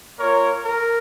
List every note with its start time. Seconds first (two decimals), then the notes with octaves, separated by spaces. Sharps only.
0.18 A#3 F4 A#4 C#5
0.64 A#4